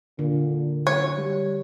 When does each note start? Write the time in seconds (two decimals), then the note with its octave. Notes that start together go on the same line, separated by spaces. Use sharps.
0.19 A#2 D3
0.87 F#1 C#5
1.17 G3